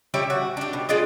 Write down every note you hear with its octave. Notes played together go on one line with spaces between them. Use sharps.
G3 E4 G4 C#5
F#4
D4 G4
B2
G#3 D4 F4 D#5